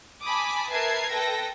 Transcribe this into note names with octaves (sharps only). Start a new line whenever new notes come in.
G#5 A5 B5 D6 D#6
A#4 B4 E5 A5 G#6 C7
A4 B4 G5 A#6